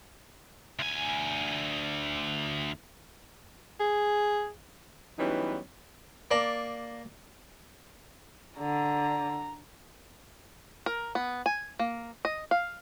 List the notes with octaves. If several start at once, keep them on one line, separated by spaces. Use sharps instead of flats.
D2 G#5
G#4
E3 F#3 G3 B3 C#4 D#4
A#3 D5 A5
D3 A#5
A#4
B3
G#5
A#3
D#5
F5